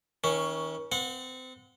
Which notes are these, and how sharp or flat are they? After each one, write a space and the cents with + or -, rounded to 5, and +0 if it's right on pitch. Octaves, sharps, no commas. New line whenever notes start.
D#3 +40 C#4 +0
C4 -30 F#5 -25